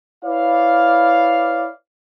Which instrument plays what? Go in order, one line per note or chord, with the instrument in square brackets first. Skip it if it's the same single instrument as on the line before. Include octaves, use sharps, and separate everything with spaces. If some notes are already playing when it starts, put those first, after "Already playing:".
[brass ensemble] E4 B4 C#5 D5 F5